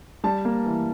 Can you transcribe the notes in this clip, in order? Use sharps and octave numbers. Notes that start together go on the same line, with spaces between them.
G3 A5
A#3
E3